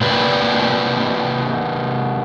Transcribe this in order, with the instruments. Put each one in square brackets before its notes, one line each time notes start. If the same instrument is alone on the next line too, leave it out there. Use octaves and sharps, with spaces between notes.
[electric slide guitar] C3 A#3 B4 D5